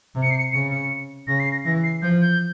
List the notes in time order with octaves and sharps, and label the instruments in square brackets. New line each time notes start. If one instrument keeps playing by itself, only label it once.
[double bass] C3
[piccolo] C#7
C7
C#7
[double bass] C#3 [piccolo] C#7
[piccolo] C#7
[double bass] C#3 [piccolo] A#6
[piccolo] C7
A#6
[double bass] E3 [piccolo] A#6
[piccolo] C7
[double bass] F3 [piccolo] G6
[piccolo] G6